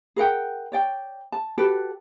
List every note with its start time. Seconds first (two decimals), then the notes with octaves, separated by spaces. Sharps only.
0.16 G#4 A#4 F#5 G5
0.72 C#5 D5 G5
1.32 A5
1.58 F#4 G4 A4 B4